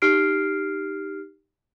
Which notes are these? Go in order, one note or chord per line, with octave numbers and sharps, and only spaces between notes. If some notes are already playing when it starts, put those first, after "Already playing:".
D#4 G4 F6 C7 D7